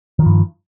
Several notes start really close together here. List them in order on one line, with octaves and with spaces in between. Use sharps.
D#3 F3 G2